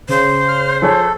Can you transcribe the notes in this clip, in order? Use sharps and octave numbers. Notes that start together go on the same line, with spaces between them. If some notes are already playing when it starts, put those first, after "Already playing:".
C#3 C5
F6
F3 G#4 A4 C#5